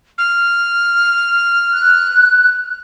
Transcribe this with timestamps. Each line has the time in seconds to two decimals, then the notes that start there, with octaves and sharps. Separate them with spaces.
0.18 F6
1.73 F#6